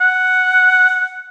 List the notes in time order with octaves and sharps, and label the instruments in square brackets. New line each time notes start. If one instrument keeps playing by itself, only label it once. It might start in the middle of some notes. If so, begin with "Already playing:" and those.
[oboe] F#5